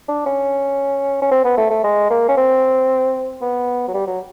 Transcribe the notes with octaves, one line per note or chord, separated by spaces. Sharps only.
D4
C#4
C#4
C4
B3
A3
A3
G#3
A#3
C#4
C4
B3
F#3
G3
F#3